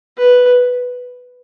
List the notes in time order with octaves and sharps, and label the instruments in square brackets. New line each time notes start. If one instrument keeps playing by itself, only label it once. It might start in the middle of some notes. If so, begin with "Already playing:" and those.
[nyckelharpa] B4